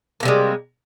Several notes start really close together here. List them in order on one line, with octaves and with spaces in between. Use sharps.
A#3 C3 G3 G#3